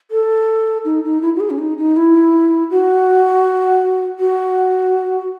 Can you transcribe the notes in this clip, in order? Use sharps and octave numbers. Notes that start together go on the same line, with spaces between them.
A4
D#4
D#4
E4
F#4
G#4
C#4
D#4
D#4
E4
F#4
F#4